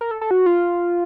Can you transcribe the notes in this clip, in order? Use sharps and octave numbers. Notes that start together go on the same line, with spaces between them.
A#4
A4
A4
F#4
F4